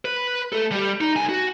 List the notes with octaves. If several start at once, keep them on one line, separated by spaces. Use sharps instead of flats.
B4
A3 A4
G3 G4
D#4
C2 G#5
F#4